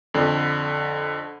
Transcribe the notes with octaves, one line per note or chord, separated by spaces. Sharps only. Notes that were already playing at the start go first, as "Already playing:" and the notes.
F2 D3